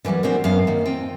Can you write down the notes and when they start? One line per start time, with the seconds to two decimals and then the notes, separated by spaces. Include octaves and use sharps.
0.05 D3 E3 F#3 G3 A#3
0.23 A#2 D3 G#3 C4 D4 F#4
0.44 F#2 B3 F5
0.67 D#3 A#3
0.85 C4 F4 G5